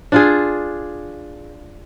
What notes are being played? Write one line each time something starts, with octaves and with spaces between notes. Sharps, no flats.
D4 F4 G#4